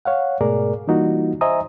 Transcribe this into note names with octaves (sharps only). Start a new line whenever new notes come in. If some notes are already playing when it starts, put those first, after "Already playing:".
C#5 F5 F#5
G#2 B2 A3 G#4 A#4 D5
E3 G3 A#3 D#4 F4 F#4
C5 D#5 E5 G#5 A#5 D#6